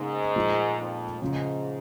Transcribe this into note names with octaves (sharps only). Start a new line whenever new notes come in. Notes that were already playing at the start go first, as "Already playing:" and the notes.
Already playing: G#2 C#3 A#3 D#4
A#2 F3 G#3 D#4
F2
G#2 C#3 F3 C#4